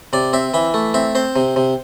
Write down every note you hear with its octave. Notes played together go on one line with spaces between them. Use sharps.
C3 D5
C4 E5
E3 E5
A3
C4 E5
C4 C5
C3
C3